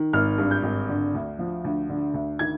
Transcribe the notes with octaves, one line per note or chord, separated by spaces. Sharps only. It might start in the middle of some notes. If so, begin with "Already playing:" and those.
Already playing: D#3
G#1 F6
G2
G6
G#1
D3
D2
F3
D2
D3
D2
D#3 G#6